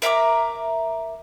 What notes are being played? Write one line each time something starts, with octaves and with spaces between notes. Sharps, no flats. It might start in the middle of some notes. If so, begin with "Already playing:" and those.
A#4 E5 A#5 D6